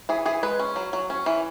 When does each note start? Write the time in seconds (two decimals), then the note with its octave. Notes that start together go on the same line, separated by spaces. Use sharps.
0.09 E3 G#4
0.26 E3 G#4
0.43 G#3 B4
0.59 C#4
0.76 F#3
0.93 F#3
1.10 C#4
1.26 E3